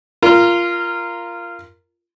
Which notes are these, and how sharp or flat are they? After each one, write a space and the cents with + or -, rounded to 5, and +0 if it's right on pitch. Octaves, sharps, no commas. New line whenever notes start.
F4 -15 A#4 +0